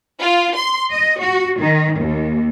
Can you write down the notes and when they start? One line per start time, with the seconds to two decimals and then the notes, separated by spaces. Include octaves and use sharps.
0.20 F4
0.55 C6
0.91 D#5
1.20 F#4
1.59 D#3
1.99 D#2